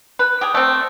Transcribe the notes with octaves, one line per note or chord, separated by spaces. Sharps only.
B4
G4 G#4
A3 C4